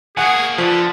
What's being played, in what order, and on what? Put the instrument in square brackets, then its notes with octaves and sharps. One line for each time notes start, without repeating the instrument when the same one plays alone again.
[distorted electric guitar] A#3 F#4 [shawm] G#4 [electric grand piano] F#5 G#5
[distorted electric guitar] D3 [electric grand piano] F3 [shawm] B4